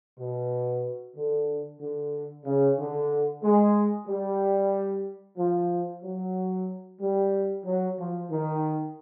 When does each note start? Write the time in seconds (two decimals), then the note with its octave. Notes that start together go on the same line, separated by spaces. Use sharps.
0.18 B2
1.16 D3
1.80 D3
2.45 C#3
2.78 D3
3.43 G#3
4.07 G3
5.38 F3
6.03 F#3
7.00 G3
7.64 F#3
7.98 F3
8.29 D#3